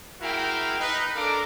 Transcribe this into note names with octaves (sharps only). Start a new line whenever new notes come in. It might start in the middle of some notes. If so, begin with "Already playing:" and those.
G#3 E4 F#4 A#4 F5 G5
D#4 B4
D4 A4 A#4 F5 A#5 D6